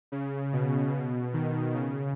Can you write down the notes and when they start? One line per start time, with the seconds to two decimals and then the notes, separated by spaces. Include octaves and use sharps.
0.12 C#3
0.53 B2
0.93 B2
1.34 D#3
1.74 C#3